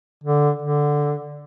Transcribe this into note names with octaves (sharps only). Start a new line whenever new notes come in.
D3
D3